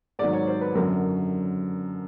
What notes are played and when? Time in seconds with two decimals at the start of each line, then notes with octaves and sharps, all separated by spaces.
0.19 G#2 D#3 F#3 D5
0.33 C#5
0.47 C5
0.61 B4
0.75 F#2 D3 F#3 A#4